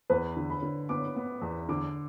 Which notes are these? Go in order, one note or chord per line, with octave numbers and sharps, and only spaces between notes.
E2 B4
D3
B5
D3
B3 D6
B3
E2
D3 D6